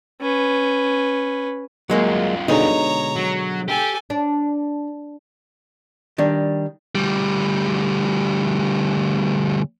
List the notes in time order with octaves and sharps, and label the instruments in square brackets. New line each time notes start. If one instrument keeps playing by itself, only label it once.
[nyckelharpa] C#4 B4
[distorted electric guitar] C2 F4 [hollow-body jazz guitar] F#3 G#3 A#3
[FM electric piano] B2 D3 G#3 [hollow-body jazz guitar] D#4 [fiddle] C#5 A#5
[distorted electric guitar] F#3
[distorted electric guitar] G4 [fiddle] A4 G#5
[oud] D4
[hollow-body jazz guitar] D#3 G3 D4
[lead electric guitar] D2 G3